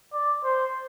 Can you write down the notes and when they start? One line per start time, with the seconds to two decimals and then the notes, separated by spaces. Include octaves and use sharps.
0.13 D5
0.44 C5